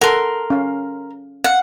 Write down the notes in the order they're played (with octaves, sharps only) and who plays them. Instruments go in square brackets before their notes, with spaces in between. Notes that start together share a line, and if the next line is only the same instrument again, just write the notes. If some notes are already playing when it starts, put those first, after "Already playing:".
[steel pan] A4 F#5 [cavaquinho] A#4 C6
[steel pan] C#4 F5
[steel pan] F5 [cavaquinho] F#5